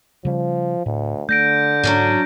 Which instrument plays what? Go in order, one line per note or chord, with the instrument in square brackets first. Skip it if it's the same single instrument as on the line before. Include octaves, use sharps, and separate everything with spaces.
[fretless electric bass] C#3 G3 [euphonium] F3
[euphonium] D2 [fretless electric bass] A2
[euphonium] D3 [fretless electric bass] A3 [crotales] G6 A#6 D7
[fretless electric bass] G#2 [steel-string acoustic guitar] F#3 C#4 D4